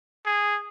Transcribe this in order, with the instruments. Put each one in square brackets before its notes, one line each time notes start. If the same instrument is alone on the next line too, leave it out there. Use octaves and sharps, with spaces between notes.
[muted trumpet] G#4